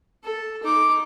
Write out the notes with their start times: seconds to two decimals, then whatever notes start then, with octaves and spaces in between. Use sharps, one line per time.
0.23 A4
0.63 D#4 D6